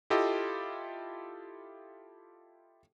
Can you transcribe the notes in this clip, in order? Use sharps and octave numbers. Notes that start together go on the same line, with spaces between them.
E4 F4 G4 A4 D#5